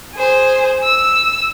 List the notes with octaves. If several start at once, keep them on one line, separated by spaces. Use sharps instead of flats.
G#4 C5
E6